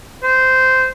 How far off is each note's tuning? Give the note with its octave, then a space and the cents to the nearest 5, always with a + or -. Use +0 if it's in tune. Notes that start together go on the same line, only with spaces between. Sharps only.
C5 -10